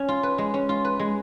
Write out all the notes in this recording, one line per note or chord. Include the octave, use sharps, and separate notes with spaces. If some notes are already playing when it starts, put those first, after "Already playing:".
Already playing: C#4
F4
B4
G#3
C#4
F4
B4
G#3